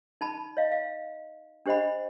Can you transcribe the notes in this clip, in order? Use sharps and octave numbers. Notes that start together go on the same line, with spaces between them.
D#4 A5 B5
C#5 D#5 F5
F5
D4 G4 C5 D#5 F#5 B5